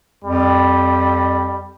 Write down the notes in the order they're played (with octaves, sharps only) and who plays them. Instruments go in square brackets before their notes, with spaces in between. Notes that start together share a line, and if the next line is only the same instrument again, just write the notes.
[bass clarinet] F2 [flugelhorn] G3